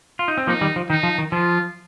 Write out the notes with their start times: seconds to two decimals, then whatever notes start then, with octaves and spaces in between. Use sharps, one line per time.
0.19 F4
0.28 D#4
0.38 C4
0.47 F3 A#3 D#4
0.61 D#3 G3
0.76 F3
0.90 D#3 D#4
1.03 F3
1.18 D#3
1.32 F3 F4